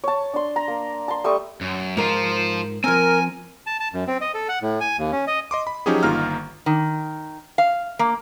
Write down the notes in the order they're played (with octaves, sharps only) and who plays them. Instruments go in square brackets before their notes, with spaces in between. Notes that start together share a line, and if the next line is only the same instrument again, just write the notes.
[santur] C#5 A5
D4 C6
A#5
A#3
A5 C6
G3 A3 C#6 D#6
[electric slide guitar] F#2
[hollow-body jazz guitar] G#2 A#4 [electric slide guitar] F3 F4
[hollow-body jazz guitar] F3 C4 [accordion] A#4 [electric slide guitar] G#5
[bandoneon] A5
A5
F#2
C4
D#5
A4
F#5
A2
G#5
D#2
C#4
D#5
[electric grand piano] D#5 C6 D6
B5
F3 F#3 C#4 D#4 G4 G#4
G1 D#3 A#3 F4 A#5 F6
[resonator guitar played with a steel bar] D#3
F5
A#3